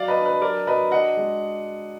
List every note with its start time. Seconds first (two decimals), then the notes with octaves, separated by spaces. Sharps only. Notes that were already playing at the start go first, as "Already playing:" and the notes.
Already playing: F#3 D5 F5
0.08 B4 D#5
0.17 D4
0.26 B4
0.42 F#3 A#4 D5
0.67 F#3 B4 D#5
0.91 D4 D#5 F#5
1.17 G#3